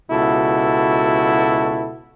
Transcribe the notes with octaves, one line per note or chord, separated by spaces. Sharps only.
C#2 B2 E4 F#4 A4